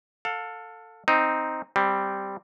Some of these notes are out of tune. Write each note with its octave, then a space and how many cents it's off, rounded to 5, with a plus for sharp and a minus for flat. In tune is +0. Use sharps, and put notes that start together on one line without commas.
A4 +15 F5 +30
C4 +0 D#4 +0
G3 +0 C4 +0